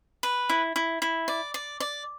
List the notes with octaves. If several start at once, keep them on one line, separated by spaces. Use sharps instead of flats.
B4
E4
E4
E4
D5
D5
D5